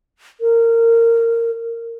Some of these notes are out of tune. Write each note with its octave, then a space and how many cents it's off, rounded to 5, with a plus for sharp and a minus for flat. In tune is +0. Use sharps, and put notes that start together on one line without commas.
A#4 -20